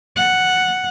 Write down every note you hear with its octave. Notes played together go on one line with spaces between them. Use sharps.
F#5